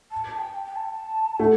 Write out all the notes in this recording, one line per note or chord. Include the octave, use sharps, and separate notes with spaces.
A5
A5
G5
G5
A5
A3 F#5